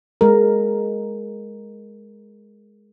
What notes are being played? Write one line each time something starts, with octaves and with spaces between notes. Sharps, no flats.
G#3 A#4